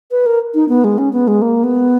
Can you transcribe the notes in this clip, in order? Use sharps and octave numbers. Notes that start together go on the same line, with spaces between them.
B4
A#4
D#4
B3
G#3
C#4
B3
G#3
A#3
B3